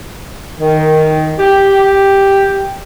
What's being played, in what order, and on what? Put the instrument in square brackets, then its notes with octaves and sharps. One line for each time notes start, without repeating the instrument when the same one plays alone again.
[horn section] D#3
G4